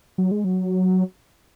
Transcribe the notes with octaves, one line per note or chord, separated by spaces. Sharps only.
F#3
G#3
F#3